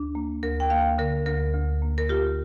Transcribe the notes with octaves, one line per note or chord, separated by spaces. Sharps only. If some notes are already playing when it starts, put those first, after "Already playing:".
Already playing: D2 D4
A#3
D2 A#4
G5
A#3 F5
D3 A#4
D2 A#4
D2
A#3
A#4
F4 G4